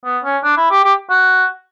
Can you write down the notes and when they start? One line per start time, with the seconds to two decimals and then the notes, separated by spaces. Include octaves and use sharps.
0.05 B3
0.24 C#4
0.44 D4
0.57 E4
0.71 G4
0.84 G4
1.10 F#4